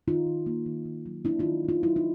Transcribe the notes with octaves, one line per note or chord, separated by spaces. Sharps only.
D#3 D#4 F4
D#3
A#3
D#3
D#3
F#3
A#3 D4 E4
D#4 F4
D#3
D#3 D#4 F4
F#3 E4
D#4